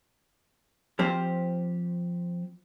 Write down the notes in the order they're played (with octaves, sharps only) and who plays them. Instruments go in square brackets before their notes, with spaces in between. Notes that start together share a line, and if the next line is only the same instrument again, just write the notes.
[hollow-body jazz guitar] F3 C4 G4 C5